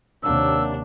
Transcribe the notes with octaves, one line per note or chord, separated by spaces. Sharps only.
D#2 C3 F#3 A#3 D4 E5 E6